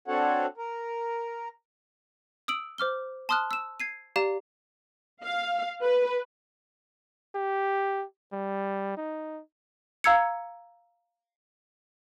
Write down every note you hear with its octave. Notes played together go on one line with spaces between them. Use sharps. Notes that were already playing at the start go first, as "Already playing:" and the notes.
C4 D4 F#4 A4 C#5 F#5
A#4
D#6 E6 D7 F#7
C5 D6 F6 G7
A5 C6 D#6 F6 F#6
E6 E7
G#6 C7 D#7
G4 D5 F5 A#5 E7
F5
B4
G4
G3
D#4
F5 A#5 E6 G#6 C#7